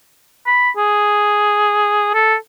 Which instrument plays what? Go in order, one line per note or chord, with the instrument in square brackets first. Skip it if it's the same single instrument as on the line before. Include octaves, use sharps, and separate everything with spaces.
[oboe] B5
G#4
A4